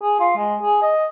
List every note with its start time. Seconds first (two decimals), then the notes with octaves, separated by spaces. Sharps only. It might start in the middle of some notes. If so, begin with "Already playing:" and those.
0.03 G#4
0.20 F4
0.37 G#3
0.63 G#4
0.82 D#5